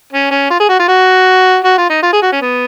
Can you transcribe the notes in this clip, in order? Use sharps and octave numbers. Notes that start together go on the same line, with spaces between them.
C#4
C#4
F4
G#4
F#4
F4
F#4
F#4
F4
D#4
F4
G#4
F#4
C#4
B3